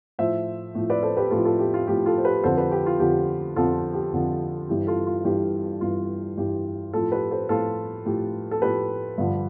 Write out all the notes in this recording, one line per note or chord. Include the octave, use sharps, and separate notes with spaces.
A2 F3 C5 E5
A2 F3
B4 D5
A4 C5
G4 B4
A2 F3 F4 A4
F4 A4
G4
F4
A2 F3 G4
F4 A4
C5
G4 B4
F2 D3 F3 A4 C5
G4 B4
G4
F4
F2 D3 F3 G4
F2 D3 F3 F4 A4
G4
F2 D3 F3
G2 E3 G4
F4 A4
F4
G2 E3 G4
G2 E3 F4
G2 E3 G4
A2 F3 F4 A4
G4 B4
A4 C5
A2 F3 F4 A4
A2 F3 G4
A4
A2 F3 G4 B4
G2 D3 F3